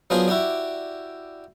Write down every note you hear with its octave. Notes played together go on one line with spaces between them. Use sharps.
F#3 B3 D4 F4 G#4 C5
E4 F#4 G4 D5